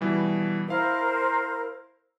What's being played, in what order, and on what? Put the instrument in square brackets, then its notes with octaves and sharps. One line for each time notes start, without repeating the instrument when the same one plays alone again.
[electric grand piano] B2 E3 G3
[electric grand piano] E4 F5 [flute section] A#4 C5